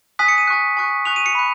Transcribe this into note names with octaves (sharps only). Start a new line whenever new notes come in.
G#5 D#6 F#6 B6
C#7
D#7
G#5 C#6 F#6
G#5 C#6 F#6
G#5 C#6 F#6 F7
D#7
C#7
B5 F#6